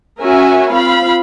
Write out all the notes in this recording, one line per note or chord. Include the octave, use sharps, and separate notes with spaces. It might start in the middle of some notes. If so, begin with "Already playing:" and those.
C#4 F#4 A#4 C#5 E5 G#5
C4 F4 F5 B5